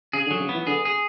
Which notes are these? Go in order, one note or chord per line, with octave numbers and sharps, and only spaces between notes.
C#3 G#4
D3
F#3
C#3
E3 B3
D3 G#4
G#4